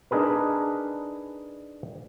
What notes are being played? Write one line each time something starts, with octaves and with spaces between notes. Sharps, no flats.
D4 D#4 G#4 A#4 B4